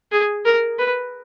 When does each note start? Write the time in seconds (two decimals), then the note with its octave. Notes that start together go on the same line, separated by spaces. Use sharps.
0.12 G#4
0.45 A#4
0.79 B4